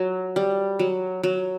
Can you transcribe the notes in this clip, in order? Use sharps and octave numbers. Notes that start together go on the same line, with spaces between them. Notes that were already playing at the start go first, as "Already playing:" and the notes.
Already playing: F#3
G3
F#3
F#3